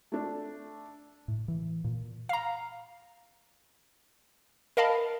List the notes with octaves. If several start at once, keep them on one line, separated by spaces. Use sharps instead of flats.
A3 D4
A2
E3
A#2
F5 A#5
A#4 D#5 F5 A5 B5